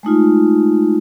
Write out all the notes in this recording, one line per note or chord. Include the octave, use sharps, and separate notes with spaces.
G#3 A3 D#4 F4